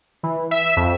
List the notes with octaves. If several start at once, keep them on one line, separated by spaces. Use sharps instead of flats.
E3
E5
F2